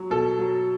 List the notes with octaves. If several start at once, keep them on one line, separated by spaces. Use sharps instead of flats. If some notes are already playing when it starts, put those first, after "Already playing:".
Already playing: F#3
B2 A4
F#3